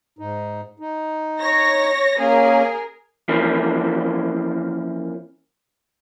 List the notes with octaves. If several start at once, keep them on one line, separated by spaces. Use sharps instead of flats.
G#2 D#4
D#4
C#5 A#6
A#3 C#4 G#4 A#4
E3 F3 A#3 C#4